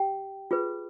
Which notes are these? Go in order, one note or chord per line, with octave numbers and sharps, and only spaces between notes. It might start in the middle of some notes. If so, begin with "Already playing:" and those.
Already playing: G4 G5
F4 G#4 B4